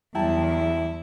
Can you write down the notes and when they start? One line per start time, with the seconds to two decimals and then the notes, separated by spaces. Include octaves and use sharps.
0.15 E2 F#3 G3 E4 G5 A5 A#5